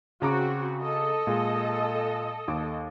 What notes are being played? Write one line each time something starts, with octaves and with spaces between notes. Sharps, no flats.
C#3 C4 F#4 A#5 D6
A4 D#5
A#2 G#3
D#2 D6